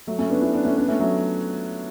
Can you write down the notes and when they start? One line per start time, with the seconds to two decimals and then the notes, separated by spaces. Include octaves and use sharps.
0.07 F#3 A3
0.19 A3 C#4
0.30 B3 D4
0.41 C#4 E4
0.53 B3 D4
0.64 A3 C#4
0.77 B3 D4
0.88 A3 C#4
1.00 F#3 A3